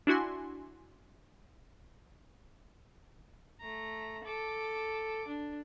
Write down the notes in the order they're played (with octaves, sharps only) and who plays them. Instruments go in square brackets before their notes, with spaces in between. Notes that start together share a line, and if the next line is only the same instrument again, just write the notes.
[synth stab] D4 E4 F#4 G#5 C6
[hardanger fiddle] A3 A#5
A4 D6
D4